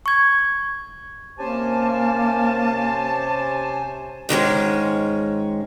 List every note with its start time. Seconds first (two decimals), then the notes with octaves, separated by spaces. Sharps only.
0.06 C#6 G#6
1.39 C3 A#3 C#4 G4 C5 G#5 A5
4.29 G#2 D#3 G#3 C#4